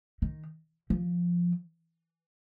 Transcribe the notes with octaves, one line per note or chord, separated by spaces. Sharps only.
D#3
F3